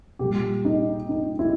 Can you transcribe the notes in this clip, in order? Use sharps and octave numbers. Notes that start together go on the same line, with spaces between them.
A#2 G3 G4
D#4
D#4
E4